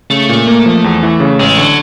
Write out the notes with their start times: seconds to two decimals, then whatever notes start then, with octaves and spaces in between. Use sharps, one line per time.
0.10 C#3 A3
0.29 A#2
0.47 A#3
0.66 F3
0.84 E2
1.03 E3
1.20 C#3
1.39 A1 G#3
1.58 D3 F#3